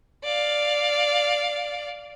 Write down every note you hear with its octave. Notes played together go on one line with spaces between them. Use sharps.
D5 F5